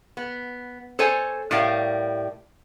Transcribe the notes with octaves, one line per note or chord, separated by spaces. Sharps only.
B3
A4 C5 C#5 G#5
A2 G3 A#4 F5